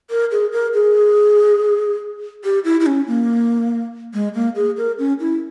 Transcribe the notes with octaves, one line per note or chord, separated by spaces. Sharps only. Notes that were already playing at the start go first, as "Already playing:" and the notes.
A#4
G#4
A#4
G#4
G4
E4
E4
C#4
A#3
G#3
A#3
G#4
A#4
C#4
E4